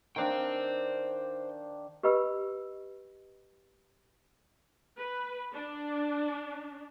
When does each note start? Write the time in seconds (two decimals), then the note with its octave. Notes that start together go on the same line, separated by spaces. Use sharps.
0.16 D#3 D4 C5 F5 G5
2.03 G4 B4 D#5 B5 E6
4.98 B4
5.54 D4